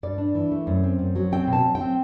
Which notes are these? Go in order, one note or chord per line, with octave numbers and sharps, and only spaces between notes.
G2 D5
D4
E3
A3
F#2
C4
F#2
F#3
C4 G5
B2
A5
F#3
G5
C4